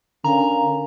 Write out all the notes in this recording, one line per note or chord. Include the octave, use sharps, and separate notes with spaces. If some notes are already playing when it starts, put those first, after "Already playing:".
D3 C#4 A#4 F5 G#5 A#5